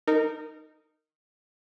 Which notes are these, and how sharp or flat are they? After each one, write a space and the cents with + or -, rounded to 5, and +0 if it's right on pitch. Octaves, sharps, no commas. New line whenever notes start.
D#4 +0 A#4 -20